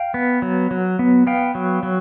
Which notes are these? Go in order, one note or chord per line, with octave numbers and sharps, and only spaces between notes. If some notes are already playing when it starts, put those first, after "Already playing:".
Already playing: F5 G5
B3
F#3
F#3
B3
B3 F5 G5
F#3
F#3